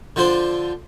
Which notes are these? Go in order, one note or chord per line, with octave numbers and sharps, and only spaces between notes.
D3 F3 C5